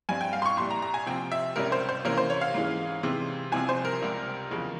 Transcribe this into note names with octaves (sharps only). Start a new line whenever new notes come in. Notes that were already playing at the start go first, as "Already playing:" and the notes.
G2 G3 C4 G#5
G5
F5
C6
C#6
C2 A#2 G3 C6
A#5
A#5
G#5
C3 F3 C4 G5
E5
C#2 C3 G3 C#4 A#4
C5
C5
C3 E3 A#3 C#4 A#4
C5
C#5
F5
G#2 E3 G#3 C#4
C3 E3 G#3 C4
C2 C3 F3 C4 G#5
C5
A#4
C#2 C3 G3
E2 C#3 F3 G#3